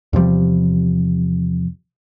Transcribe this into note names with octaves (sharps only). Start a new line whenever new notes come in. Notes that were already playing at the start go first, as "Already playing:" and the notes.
E2 C3 F3 G3